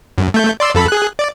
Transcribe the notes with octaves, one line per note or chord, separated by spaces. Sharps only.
F#2
A3 G6
D5 C6 E6
F2 A4 B5
G#4 F#6
D5